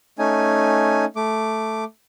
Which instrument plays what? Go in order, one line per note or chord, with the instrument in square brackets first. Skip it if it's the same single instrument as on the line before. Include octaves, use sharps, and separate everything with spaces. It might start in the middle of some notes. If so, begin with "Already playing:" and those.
[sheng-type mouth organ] A3 C#4 D#4 G#5
A3 D6